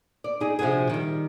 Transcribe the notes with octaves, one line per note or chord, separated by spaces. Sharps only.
D5
D#4 G#4
C3 F3 D4 F#4 G#4
D#3 G3